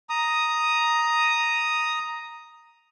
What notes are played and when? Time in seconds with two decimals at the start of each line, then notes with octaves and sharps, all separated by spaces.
0.10 A#5 D#6